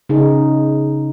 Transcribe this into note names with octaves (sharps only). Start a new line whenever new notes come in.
C#3 D#4 G#4